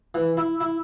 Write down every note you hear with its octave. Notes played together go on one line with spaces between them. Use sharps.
E3
E4
E4